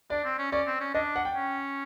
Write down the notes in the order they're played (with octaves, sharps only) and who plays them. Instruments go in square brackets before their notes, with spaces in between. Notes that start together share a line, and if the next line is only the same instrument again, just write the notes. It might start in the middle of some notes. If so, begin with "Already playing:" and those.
[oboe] D4 [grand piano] D5
[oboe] C4
C#4
[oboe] C#4 [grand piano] D5
[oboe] C4
C#4
[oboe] D4 [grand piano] D#5
[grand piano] F#5
G5
[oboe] C#4